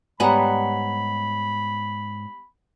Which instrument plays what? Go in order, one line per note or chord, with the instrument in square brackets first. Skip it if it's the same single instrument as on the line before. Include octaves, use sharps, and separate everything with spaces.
[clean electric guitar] G#2 C#5 [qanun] G3 B3 F#5 [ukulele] G#5 A#5 [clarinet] B5